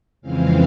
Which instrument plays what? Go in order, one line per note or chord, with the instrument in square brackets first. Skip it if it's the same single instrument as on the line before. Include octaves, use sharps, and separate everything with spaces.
[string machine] F2 C#3 E3 G#3 C4 F5